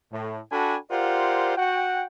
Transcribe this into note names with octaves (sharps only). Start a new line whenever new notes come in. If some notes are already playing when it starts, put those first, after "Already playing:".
A2
D4 F#4 A4 G5 G#5 B5
F4 G4 A#4 C5 D5 F#5
F#4 F#5 G5